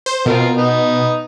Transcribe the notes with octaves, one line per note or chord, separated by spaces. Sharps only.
C5
B2 C4 F4 A#4
B3 D#4